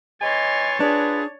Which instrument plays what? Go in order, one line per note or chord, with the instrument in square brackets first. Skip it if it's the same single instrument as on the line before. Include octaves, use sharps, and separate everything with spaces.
[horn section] E3 G#5 C6 [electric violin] C#5 A6 [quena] D#5
[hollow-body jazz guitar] D4 [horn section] F4 B4 [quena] G#4